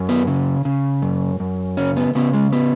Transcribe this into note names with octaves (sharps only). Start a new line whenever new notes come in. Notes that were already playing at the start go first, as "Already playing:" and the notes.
Already playing: F#2
B3
C#3
C#3
F#2
F#2
C#3 C#4
B3
C#3 B3
G#3
B3